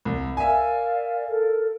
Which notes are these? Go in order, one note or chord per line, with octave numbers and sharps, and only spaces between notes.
C2
A#4 D5 E5 F5 G#5
A4 A#4